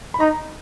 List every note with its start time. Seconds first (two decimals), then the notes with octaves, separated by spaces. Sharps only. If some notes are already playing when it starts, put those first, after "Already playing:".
0.14 B5
0.20 D#4 A#5